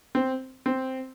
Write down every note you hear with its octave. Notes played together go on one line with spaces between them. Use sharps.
C4
C4